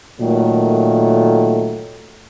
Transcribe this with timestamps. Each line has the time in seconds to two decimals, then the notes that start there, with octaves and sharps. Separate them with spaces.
0.20 A#2 D#3 F#3 A3